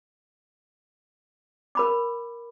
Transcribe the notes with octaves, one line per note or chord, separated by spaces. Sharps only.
A#4 B5 D6